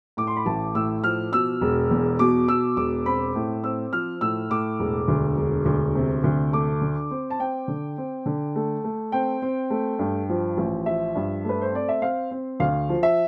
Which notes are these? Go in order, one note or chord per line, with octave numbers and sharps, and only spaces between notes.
A2 D6
C6
B5
A1 A5
A2 E6
F3 F6
B2 E6
E1
E2
B2 D6
B2 E6
E1 D6
C4 B5
A2
C4 E6
F3 F6
A2 E6
A2 D6
E1
D2
E1
D2
C3
D2
A3 D6
D3
C4
A5
C4 G5
D3
C4
D3
A3
A3
C4 G5
C4
A3
G2
F3
A1
F3 E5
G2
A3 B4
C5
C4 D5
E5
C4 F5
C4
D2 F5
F3
E5